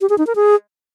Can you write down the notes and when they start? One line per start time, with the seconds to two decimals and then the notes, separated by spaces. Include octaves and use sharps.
0.01 G4
0.09 G#4
0.18 D#4
0.27 A#4
0.36 G#4